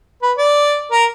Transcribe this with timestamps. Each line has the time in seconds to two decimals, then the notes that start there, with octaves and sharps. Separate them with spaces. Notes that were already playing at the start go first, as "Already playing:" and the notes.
0.23 B4
0.38 D5
0.92 A#4